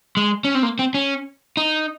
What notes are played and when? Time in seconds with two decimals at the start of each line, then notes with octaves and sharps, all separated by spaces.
0.17 G#3
0.45 C#4
0.55 C4
0.63 A#3
0.79 C4
0.94 C#4
1.57 D#4